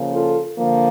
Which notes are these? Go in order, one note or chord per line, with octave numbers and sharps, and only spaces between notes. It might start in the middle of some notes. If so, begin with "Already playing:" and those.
Already playing: C#3 F3 A#3
F4 A4
D3 F3 A#3